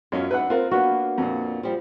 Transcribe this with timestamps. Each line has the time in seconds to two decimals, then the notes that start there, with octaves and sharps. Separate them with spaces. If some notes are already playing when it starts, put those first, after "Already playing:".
0.12 F#2 C#4 F4 D#5
0.31 D4 D#4 B4 E5 F#5
0.50 C4 F4 A#4
0.71 A#3 B3 D4 F#4
1.18 F2 A#2
1.63 F3 G3